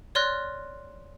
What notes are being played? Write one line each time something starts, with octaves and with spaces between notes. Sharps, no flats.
C#5 D5 C6 F6 F#6 A#6